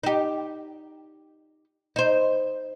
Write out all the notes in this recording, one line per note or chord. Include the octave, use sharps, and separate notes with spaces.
D#4 G4
D#4 C5